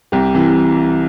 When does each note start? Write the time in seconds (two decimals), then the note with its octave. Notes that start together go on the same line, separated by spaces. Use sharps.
0.12 C2 G4
0.34 C3 E3